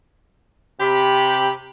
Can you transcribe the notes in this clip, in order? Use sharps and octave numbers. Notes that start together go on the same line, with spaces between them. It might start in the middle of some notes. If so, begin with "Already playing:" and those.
C3 G4 B5